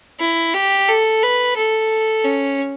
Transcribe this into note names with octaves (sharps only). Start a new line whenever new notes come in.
E4
G4
A4
B4
A4
C#4